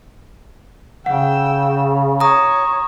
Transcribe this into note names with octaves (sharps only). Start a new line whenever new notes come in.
C#3 F#5 G5 E6
C#5 A#5 D#6